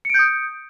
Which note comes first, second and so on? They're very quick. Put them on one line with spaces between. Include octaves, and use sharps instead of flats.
C#7 D7 G6 D#6